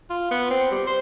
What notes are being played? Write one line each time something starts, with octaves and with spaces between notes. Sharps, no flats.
F4
B3
C4
G3
C5